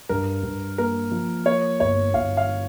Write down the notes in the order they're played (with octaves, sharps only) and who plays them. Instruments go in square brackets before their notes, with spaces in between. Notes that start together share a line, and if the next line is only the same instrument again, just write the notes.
[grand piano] G2 [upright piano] A#4
[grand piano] G2
[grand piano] A#3 [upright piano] A#4
[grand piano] F3
[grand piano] A#3 [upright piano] C#5
[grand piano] G1 [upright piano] C#5
[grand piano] G1 [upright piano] F5
[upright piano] F5